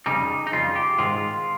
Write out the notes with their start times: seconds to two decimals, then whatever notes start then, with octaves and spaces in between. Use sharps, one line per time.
0.06 F2 C#3 G3 D#4
0.47 D#4
0.52 F2 C#3 G3 F4
0.76 G4
0.98 G#2 D#3 G#3 F4